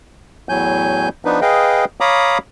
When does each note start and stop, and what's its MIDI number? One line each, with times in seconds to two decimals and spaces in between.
0.49 1.09 40
0.49 1.09 45
0.49 1.09 54
0.49 1.09 80
0.49 1.09 91
1.25 1.40 53
1.25 1.40 59
1.25 1.40 62
1.25 1.40 63
1.25 1.40 71
1.42 1.85 68
1.42 1.85 71
1.42 1.85 75
1.42 1.85 77
1.42 1.85 79
2.00 2.38 73
2.00 2.38 77
2.00 2.38 82
2.00 2.38 83
2.00 2.38 86
2.00 2.38 87